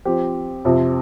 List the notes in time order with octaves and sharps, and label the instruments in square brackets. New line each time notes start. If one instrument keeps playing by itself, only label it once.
[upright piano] F3 C4 G4
F2 C3 F3 C4